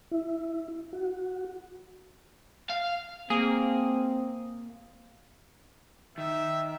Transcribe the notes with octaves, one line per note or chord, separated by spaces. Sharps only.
E4
F#4
F5
A#3 C4 G#4
D#3 E5